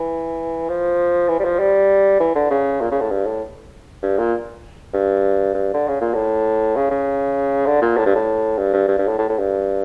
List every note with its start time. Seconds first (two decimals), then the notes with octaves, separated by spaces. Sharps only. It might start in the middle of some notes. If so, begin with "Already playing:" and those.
Already playing: E3
0.69 F3
1.28 E3
1.39 G3
1.44 F3
1.59 G3
2.20 E3
2.35 D3
2.50 C#3
2.81 A#2
2.91 C#3
3.01 A2
3.11 G2
3.26 A2
4.03 G2
4.18 A#2
4.93 G2
5.54 G2
5.73 D3
5.88 C#3
6.01 A#2
6.14 A2
6.76 C#3
6.91 C#3
7.66 D3
7.81 A#2
7.97 A2
8.06 G2
8.15 A2
8.58 G2
8.73 G2
8.88 G2
8.98 G2
9.08 A2
9.18 A2
9.29 A2
9.39 G2